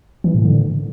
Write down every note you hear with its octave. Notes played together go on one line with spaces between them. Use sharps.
E3
A2
D3